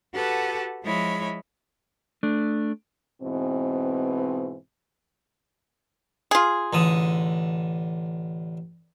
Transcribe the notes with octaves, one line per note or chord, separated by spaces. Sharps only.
F#4 G4 A4 B4 F#5 A5
F3 G#3 E4 C#5 D#5 B5
A3 D4
G#2 B2 E3 C4
F4 G#4
A1 D3 D#6